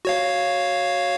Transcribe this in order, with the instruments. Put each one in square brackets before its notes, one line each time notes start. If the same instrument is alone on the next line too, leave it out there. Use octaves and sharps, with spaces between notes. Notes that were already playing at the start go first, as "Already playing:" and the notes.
[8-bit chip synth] F#4 C#5 F5